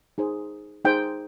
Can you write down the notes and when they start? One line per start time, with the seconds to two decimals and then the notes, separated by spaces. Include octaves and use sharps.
0.18 D#4 G#4 C5
0.85 D#4 G#4 C5 G5